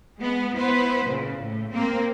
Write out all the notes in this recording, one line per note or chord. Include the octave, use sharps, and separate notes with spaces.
G#3 B3
B3 E4 B4 C5
A#2 C#3
A2
A#3 C4